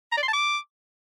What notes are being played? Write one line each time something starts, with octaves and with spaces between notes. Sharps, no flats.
A#5
D5
C6
A5
D6